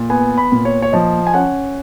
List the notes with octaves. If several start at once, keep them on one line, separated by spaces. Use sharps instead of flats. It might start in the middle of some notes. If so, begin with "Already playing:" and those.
Already playing: A#2
B3 G#5
B5
A#2
C#5
C#5
F3 D#5
G#5
C#4 F#5